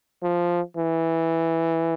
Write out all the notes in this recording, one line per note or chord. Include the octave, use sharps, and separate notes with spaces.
F3
E3